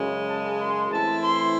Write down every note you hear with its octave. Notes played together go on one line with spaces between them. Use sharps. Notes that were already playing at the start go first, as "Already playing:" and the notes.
Already playing: F#2 C#3 G#3
A5
C6
A2 E3 C4 E4 A5
C6